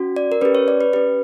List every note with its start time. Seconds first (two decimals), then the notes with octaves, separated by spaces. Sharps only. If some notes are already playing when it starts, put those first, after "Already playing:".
Already playing: C#4 F#4
0.16 D5
0.32 A#4
0.41 C#4 G4 B4
0.55 C#5
0.68 D5
0.81 B4
0.93 C#4 G4 B4